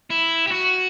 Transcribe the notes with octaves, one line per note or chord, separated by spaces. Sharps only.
E4
G4
F#4